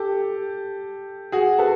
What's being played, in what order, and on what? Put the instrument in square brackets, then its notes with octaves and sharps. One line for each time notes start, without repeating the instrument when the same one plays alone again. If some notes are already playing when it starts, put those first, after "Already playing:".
Already playing: [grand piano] G4 A4
F#4 G#4
A4 B4